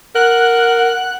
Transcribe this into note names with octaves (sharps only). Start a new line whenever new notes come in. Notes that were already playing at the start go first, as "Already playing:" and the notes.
A#4 F#5 F#6